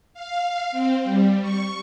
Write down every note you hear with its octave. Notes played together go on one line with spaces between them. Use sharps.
F5
C4
G3
C#6